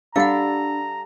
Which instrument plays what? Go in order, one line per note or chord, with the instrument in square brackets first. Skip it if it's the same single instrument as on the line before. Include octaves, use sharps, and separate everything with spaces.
[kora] G3 A4 D5 [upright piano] D4 B5 [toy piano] F5 F#5 [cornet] A#5